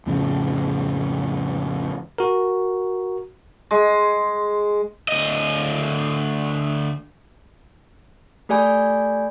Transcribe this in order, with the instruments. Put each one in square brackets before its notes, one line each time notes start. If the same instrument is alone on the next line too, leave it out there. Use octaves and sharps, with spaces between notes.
[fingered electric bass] F2 A2 C#3 F3
[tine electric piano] F#4 A#4
[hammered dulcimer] G#3
[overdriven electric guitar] D2 D#5
[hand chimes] A3 G4 D5 G#5 B5 G6